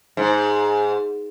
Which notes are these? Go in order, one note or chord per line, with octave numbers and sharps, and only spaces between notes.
G#2